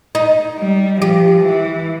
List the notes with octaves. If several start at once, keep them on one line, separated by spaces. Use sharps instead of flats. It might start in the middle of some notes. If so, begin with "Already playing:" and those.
D#4
G3
F3 G4
E3